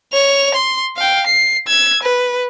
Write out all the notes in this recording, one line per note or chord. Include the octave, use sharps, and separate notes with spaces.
C#5 F7
C6
F5 G5
C7
E6 G#6
B4